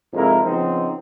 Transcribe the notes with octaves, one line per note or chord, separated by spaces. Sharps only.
F2 G#2 C3 G#3 E4 A#4
C#3 F3 B3 C4 D#4